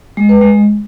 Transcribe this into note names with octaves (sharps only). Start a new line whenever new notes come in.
G#3
B4
G#3